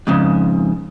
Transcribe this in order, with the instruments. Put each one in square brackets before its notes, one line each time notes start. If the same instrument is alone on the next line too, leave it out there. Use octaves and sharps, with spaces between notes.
[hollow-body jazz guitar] F2 G#2 C#3